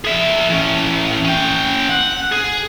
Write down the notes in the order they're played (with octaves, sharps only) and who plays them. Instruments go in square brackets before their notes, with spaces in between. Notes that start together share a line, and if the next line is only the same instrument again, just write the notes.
[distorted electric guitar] G#4 E5
E3 C#4
C#4 G5
F#5
G#4